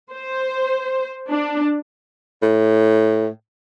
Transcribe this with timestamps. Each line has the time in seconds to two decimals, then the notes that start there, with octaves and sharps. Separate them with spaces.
0.12 C5
1.29 D4
2.43 A2